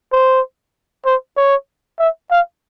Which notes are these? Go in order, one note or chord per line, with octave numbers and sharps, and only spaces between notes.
C5
C5
C#5
E5
F5